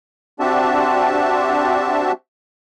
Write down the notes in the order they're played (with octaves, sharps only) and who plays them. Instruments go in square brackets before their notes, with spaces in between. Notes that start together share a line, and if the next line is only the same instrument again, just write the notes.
[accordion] C4 D4 F#4 G4 E5 A5